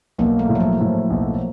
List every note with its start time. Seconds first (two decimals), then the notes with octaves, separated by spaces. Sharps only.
0.18 B1 A#3
0.39 A3
0.49 A2
0.55 F#3
0.60 F3
0.81 A2
1.10 B1